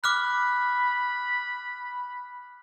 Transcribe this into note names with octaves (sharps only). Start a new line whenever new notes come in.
B5 D6 F6 F#6